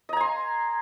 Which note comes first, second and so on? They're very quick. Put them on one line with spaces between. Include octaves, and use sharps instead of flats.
D#5 A#5 G#5 C6